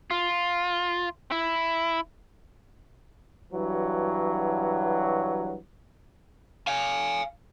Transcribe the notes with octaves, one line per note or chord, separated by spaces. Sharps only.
F4
E4
G2 E3 F#3
F5 G#5